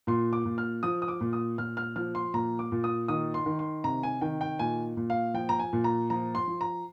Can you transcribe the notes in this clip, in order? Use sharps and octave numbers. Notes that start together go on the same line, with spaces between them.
A#2 C6
D6
A#2
F6
F3 D#6
D#6
D6
A#2
D#6
A#2 F6
F6
F3 F6
C6
A#2 A#5
D6
A#2
D#6
D#3 D#6
C6
D#3
C6
C3 A#5
G#5
D#3 G5
G5
A#2 G#5
A#2
F5
F3 G5
A#5
G#5
A#2
A#5
F3 A#5
C6
F3
A#5